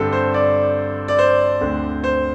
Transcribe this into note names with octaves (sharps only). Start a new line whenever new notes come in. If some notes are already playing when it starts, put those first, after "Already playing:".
Already playing: G2 D3 C4 A4
C5
D5
D5
C5
D2 D3 C4
C5